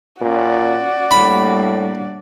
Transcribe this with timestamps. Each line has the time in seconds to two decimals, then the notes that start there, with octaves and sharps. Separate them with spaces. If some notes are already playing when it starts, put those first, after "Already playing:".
0.21 A#2 C#4 F#4 D5
1.11 A2 G3 A#3 D4 B5